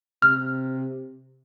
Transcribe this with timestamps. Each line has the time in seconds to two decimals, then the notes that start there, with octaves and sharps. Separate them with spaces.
0.22 C3 F6